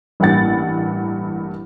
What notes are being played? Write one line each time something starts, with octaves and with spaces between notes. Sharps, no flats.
A1 G2 A#3 F#5 A6